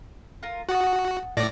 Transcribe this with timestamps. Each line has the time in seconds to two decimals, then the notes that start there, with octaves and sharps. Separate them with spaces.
0.43 F4 A#4
0.69 F#4 F#5 A5 D#6
1.37 A2 D5 A#6